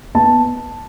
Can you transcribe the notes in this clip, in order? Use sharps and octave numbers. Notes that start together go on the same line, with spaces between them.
B3 A5